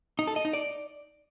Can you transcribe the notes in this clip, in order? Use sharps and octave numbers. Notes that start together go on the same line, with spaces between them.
D#4
A4
D#5
D#4
D5